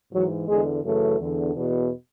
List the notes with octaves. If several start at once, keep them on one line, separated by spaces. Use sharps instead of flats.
G#2 E3 F#3
E2 D3 G#3
F#2 C#3 E3 A3
E2 D3
E2 B2